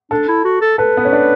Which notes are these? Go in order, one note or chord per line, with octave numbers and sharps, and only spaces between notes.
D4 A4
E4
F#4
A4
A4 B4
B3
C#4
D4